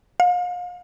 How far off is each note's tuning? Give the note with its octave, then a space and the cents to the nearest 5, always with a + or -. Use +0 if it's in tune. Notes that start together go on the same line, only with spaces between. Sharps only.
F5 +40